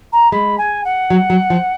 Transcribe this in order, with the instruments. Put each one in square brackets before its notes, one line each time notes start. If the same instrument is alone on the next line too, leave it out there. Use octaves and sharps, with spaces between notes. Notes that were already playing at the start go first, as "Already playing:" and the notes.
[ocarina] A#5
[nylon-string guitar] G#3 [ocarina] B5
[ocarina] G#5
F#5
[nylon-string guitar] F#3
F#3
F3